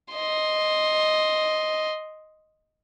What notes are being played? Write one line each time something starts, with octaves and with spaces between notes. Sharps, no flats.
D#5 C6